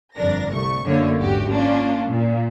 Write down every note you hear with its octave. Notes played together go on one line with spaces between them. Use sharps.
G1 F2 D4 A#4 A#6
C2 A3 C#6
F#2 D3 A3 A#3 C#5
G#1 E2 F#4 G4
A#3 C#4 D4 F4
A#2